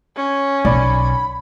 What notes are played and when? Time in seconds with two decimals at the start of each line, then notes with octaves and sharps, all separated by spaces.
0.16 C#4
0.65 B1 D5 B5